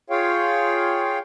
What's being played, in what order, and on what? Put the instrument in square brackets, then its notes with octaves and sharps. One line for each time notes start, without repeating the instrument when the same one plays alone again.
[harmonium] F4 G#4 C#5 F5 G5